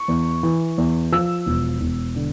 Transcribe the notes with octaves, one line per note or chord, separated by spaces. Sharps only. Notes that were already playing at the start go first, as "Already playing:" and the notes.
Already playing: C#6
E2
E3
E2
F3 E6
E1
E1
D3